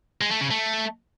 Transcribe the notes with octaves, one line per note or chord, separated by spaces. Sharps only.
G#3
A3
C#3
A3